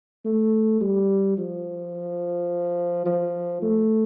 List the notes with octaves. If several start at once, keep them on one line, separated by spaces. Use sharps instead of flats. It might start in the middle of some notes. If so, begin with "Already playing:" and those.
A3
G3
F3
F3
A3